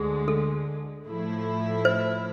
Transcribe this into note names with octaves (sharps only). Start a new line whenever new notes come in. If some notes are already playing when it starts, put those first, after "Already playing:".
Already playing: D2 D3 G#3 G#4
A4
A2 F3 A3 E4
C5